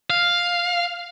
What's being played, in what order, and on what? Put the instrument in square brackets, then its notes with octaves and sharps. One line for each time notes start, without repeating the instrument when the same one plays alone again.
[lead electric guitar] F5